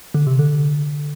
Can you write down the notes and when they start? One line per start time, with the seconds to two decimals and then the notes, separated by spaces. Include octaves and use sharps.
0.14 D3
0.27 C3
0.39 D3